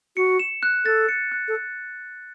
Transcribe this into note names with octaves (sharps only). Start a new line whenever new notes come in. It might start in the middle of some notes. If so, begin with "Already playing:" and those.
F#4 C#7
E7
F#6
A4 A6
C#7
F#6
A4